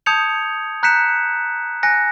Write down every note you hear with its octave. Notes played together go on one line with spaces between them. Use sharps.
A5 D#6 G6 G#6 C#7 F7
A#5 F#6 G6 B6 C#7 E7
G#5 F#6 A#6 C#7